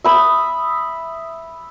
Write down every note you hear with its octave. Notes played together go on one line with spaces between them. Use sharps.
E5 B5 D#6